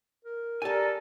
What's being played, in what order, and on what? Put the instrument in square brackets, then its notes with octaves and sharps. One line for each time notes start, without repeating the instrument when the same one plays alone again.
[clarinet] A#4
[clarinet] G4 [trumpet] A4 [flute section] A#4 D5 [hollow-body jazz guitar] G#5 A5